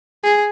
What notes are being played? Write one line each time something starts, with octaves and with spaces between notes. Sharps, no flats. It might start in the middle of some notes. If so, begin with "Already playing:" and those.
G#4